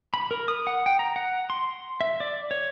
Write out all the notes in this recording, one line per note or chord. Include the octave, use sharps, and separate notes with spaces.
B5
A#4
D#6
F#5
G5
A#5
F#5
C6
E5
D5
C#5